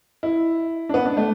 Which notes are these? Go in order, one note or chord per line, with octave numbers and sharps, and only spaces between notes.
E4
D4
B3
D4
A3